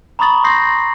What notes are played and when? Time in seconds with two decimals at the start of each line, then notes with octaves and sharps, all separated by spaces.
0.19 A#5 B5 C#6 D#6 A6 F#7
0.44 C6 D#6 G6 A#6 C7